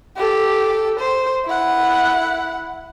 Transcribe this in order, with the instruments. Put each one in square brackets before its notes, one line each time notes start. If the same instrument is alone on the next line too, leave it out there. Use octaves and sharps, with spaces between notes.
[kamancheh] G4 A4
C5
E4 F#5